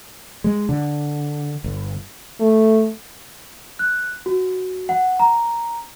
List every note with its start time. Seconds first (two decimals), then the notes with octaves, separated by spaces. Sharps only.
0.44 G#3
0.69 D3
1.64 G1
2.40 A3
3.79 F#6
4.26 F#4
4.89 F#5
5.20 A#5